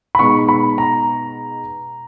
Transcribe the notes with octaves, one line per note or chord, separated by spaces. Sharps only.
B5
B2 G#3 B3 D#4 C#6
B5
A#5